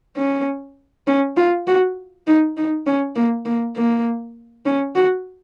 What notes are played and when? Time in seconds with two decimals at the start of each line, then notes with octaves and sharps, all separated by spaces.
0.17 C#4
1.07 C#4
1.37 F4
1.67 F#4
2.27 D#4
2.57 D#4
2.86 C#4
3.16 A#3
3.46 A#3
3.76 A#3
4.66 C#4
4.96 F#4